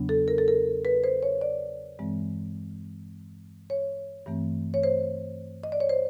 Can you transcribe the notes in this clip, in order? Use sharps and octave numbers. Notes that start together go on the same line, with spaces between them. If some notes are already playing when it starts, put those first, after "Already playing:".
Already playing: E2 C#3 F#3 B3 D4
A4
A#4
A4
A#4
B4
C5
C#5
D5
G2 E3 G#3 C4
C#5
G2 E3 A3 C4
C#5
C5
D#5
D5
C#5
C5